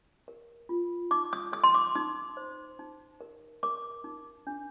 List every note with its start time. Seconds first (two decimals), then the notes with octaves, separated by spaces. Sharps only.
0.28 A#4
0.69 F4
1.11 D#4 D6
1.33 D#6
1.53 A4 D#6
1.64 C6
1.74 D6
1.95 D#4 D#6
2.37 C5
2.79 D#4
3.21 A#4
3.63 A#4 D6
4.04 D#4
4.47 D4